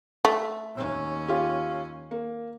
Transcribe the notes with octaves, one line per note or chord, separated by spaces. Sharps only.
A3 E5
D#2 C#4
F4 G4
A#3